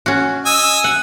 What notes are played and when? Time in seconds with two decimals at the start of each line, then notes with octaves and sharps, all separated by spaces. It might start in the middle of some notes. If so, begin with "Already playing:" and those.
0.06 C#4 F#4
0.46 D#5 G#5 E6
0.84 F#5